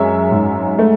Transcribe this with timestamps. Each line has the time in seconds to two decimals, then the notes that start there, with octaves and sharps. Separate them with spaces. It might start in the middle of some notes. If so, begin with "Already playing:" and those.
Already playing: F#2 G#3 C#5 E5
0.31 G#2
0.79 A3